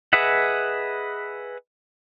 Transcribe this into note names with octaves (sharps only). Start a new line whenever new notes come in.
G#4 B4 D#5 E5 F#5